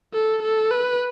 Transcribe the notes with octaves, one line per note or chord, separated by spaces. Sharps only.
A4
A4
B4